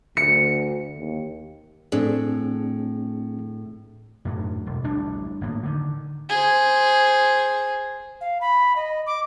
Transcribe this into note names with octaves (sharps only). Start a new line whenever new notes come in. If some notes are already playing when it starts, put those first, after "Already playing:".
D2 C#7
D#2
A2 C4 D4 G#4
F#2 A2 F#3
E1
A1 D2 G3 D4
G#1 A2 A#3
D3 D#3
G#4 C5
F5
B5
D#5
D6